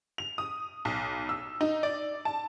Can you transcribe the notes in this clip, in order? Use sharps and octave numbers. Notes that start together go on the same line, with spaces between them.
F7
D#6
B1
E6
D#4
D5
A5